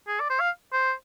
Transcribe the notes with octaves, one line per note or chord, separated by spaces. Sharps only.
G#4
D5
C5
F5
C5